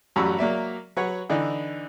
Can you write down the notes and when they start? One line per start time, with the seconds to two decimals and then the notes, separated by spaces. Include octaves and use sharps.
0.16 A1 F#2 G3 F#4 B5 E6
0.38 F#3 A#3 D5 E5
0.97 F#3 B4 C#5 F#5
1.30 D3 E3 D4 D#4